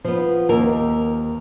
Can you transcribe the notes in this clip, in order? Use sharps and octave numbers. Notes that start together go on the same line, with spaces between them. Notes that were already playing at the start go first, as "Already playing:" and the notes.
F3 B3
D#2 A#4